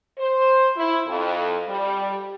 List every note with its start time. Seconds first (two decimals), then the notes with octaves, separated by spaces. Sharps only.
0.19 C5
0.77 E4
1.07 F2
1.68 G3